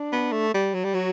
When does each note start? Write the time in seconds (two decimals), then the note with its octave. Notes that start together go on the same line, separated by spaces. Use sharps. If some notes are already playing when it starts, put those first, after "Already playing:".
Already playing: D4
0.12 B3
0.33 A3
0.54 G3
0.74 F#3
0.84 G3
0.94 F#3 F#4